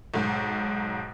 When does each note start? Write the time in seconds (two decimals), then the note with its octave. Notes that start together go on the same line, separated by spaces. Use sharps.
0.14 B1 G#2